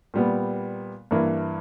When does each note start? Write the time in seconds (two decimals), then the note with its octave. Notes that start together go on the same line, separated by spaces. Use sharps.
0.14 A#2 G3 B3
1.11 G2 E3 A#3